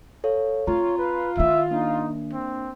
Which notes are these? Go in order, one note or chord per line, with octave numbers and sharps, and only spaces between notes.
A4 C#5 F5
C4 F4 C#5 A#5
B4
D#3 E4 E5
A#3 D4 D#4
C4